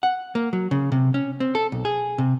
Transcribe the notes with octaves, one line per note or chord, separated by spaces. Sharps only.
F#5
A#3
F#3
C#3
C3
C#4
C4
A4
B1
G#4
C3